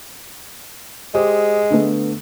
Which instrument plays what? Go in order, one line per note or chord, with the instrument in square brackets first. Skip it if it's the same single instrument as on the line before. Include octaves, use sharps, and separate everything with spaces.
[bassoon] G#3 [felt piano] G4 C5 D#6
[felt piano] D3 A3 B3